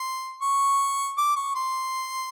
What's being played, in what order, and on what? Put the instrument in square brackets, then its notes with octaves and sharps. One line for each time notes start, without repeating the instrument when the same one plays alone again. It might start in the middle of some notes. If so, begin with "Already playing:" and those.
Already playing: [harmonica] C6
C#6
D6
C#6
C6